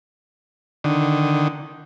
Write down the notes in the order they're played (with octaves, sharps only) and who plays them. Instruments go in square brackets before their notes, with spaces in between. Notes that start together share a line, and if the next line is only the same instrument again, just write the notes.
[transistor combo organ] D3 D#3